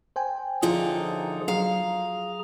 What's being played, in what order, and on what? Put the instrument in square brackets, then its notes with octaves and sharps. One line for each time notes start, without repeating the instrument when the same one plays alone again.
[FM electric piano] C5 G5 G#5
[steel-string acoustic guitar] F#2 D3 D#4 [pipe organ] F3 G#4 [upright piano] F4
[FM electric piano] F#3 [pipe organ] G#4 A#5 [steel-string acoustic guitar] F5